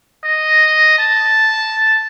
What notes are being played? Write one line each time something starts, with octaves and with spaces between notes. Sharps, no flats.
D#5
A5